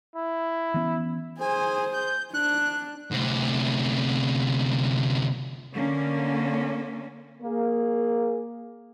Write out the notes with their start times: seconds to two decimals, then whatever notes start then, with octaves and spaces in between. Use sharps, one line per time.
0.16 E4
0.74 E3 B3 C#4
1.41 G#4 C5 G#5
1.93 G6
2.34 D4 F#6
3.12 D2 C3
5.72 D3 A#3 C#4
7.42 A#3 G#4